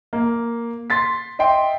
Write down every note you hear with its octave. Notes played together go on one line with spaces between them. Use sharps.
A#3
C6 A6 B6
D#5 E5 G5 C6